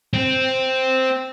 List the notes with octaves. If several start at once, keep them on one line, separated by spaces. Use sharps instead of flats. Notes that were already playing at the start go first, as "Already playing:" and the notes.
C4